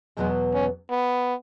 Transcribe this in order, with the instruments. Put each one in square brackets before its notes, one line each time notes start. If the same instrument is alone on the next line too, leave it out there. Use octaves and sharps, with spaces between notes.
[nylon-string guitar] E2 B2 F#3 B3 [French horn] G#3
[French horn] C#4
B3